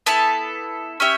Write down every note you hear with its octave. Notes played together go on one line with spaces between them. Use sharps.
B3 E4 A4 A5
C#4 E4 G4 E5